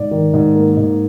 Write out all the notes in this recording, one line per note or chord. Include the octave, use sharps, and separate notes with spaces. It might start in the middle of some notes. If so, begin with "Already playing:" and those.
Already playing: G#2 D5
D#3
G#2
A#3
G#2